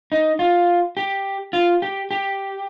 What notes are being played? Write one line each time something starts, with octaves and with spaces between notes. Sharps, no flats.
D#4
F4
G4
F4
G4
G4